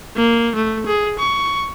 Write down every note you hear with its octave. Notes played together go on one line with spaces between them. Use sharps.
A#3
A3
G#4
C#6